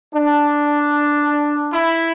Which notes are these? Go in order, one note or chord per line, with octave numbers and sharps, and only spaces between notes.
D4
E4